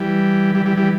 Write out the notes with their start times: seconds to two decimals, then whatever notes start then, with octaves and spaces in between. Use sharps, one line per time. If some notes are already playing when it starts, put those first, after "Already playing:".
Already playing: E3 G3
0.55 E3 G3
0.66 E3 G3
0.77 E3 G3